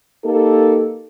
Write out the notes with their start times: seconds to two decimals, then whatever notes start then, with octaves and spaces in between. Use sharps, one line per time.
0.25 A#3 D#4 G4 A4